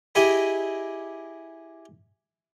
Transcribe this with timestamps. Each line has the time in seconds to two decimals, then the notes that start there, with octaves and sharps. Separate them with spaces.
0.15 E4 G4 G#4 D#5 B5